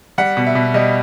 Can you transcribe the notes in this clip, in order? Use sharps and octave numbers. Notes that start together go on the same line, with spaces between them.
G3 F#5
B2
E5
B2
G3 D#5